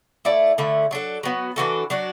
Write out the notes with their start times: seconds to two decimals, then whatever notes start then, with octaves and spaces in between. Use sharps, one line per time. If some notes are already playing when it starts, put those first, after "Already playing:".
0.25 A3 E4 D5
0.58 D3 A3 E4
0.91 F#3 D4 A4
1.23 F#3 B3 F#4
1.56 E3 D4 F#4 A4
1.90 F#3 D4 F#4